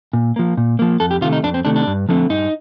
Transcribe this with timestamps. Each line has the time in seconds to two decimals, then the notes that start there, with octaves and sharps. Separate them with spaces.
0.13 A#2
0.36 F3 A#3
0.57 A#2
0.79 F3 A#3
1.00 F2 A4
1.11 G4
1.21 C3 D#3 A3 F4
1.33 D#4
1.43 F2 D4
1.54 C4
1.65 C3 D#3 A3 D4
1.76 D4
1.87 G2
2.09 D3 F3 A3 C4
2.29 G2 D#4